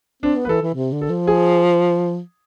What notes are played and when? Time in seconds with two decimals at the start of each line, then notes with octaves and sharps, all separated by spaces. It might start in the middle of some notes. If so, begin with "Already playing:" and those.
0.23 C4 D4
0.36 B3
0.45 B4
0.49 E3 A4
0.62 E3
0.75 C3
0.93 D3
1.02 A4
1.10 F3
1.27 G#4